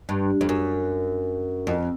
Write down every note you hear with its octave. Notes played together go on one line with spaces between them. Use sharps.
G2
F2
F#2
F2